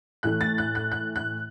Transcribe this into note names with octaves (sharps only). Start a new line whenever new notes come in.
A2 E3 A3 F#6
A6
F#6
F#6
F#6
F#6